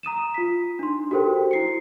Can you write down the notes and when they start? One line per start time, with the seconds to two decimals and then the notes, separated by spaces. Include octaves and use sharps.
0.03 A#5 D#6 D#7 E7
0.34 F4 B6
0.79 D4 D#4 C6
1.11 F#4 G4 A4 A#4 C5 G5
1.51 E4 C7 C#7